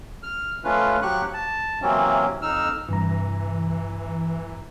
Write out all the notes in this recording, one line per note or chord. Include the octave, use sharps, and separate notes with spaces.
F6
F3 A3 C#4 F4 B4
F3 F#3 G4 C#6 F#6
A5
C3 E3 F#3 A#3 C4 C#4
F2 D#4 E6 F6
G2 C3 E3 A#5